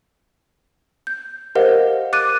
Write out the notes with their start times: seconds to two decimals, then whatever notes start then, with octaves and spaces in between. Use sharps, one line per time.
1.07 G6
1.55 G4 A#4 C5 D#5 F5 F#5
2.13 D6 F#6 A6 D#7